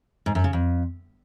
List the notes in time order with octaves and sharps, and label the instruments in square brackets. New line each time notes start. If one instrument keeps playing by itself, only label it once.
[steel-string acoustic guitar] G#2
F#2
C#3
F2